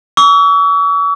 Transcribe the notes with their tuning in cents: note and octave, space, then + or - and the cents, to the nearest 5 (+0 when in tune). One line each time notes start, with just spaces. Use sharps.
C#6 +45 E6 -15